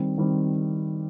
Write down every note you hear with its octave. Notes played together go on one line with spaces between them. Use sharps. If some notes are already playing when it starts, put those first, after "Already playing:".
Already playing: D#3 G3 C4
D#3 G3 C4